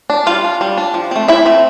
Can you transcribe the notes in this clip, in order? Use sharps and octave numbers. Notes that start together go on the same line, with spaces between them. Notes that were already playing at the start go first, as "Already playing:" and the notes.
D4
G3 F4 F5
D4
G3
D4
F3
A3 C4
F3 E4 E5
A3 C4